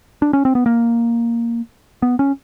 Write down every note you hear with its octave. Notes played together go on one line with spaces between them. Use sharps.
D4
C#4
C4
B3
A#3
B3
C#4